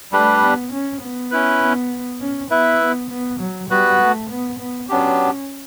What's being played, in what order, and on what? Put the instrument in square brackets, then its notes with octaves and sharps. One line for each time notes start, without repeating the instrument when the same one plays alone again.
[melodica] G3 D4 G4 B4 [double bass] A3
[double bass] B3
C#4
B3
[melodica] C#4 E4 B4
[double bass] B3
C#4
[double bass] B3 [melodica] E4 B4 E5
[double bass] B3
B3
F#3
[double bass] G3 [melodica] B3 F#4 B4
[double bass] A3
B3
B3
[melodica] F#3 B3 D4 G4 [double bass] C#4